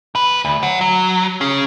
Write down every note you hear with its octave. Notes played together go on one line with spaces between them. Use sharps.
C2 B4
D2
C#5 F#5
F#3
C#4 G#4